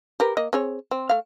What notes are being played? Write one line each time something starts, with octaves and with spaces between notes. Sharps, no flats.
G4 A#4 B4
A#3 D#5
C4 G#4 C#5
C4
A3 F5